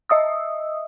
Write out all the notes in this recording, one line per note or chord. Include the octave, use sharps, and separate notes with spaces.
D#5 E5 D#6 E6